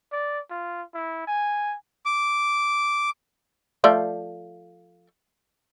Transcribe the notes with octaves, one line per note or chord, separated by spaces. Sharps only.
D5
F4
E4
G#5
D6
F3 A3 D5